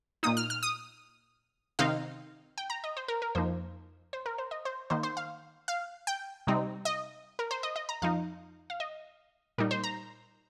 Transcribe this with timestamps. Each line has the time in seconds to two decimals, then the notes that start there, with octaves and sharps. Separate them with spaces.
0.23 A#2 A#3 D#4 D#6
0.37 F6
0.50 F6
0.63 D#6
1.79 C3 D#3 C4 D#4 F5
2.58 G5
2.70 A#5
2.84 D#5
2.97 C5
3.08 A#4
3.22 A#4
3.35 F2 F3 A#3 D#4 C5
4.13 C5
4.26 A#4
4.38 C5
4.51 D#5
4.65 C5
4.90 D#3 A#3 D#4 C5
5.03 C5
5.17 F5
5.68 F5
6.07 G5
6.47 C3 G3 C4 D#4
6.85 D#5
7.39 A#4
7.51 C5
7.63 D#5
7.76 D#5
7.89 A#5
8.02 F2 F3 D#4 F5
8.70 F5
8.80 D#5
9.58 A#2 G3 D#4 A#4
9.71 C5
9.84 A#5